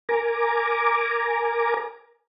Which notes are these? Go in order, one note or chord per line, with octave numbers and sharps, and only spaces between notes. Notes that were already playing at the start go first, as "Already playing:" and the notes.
A#4 G#5 A#5 D6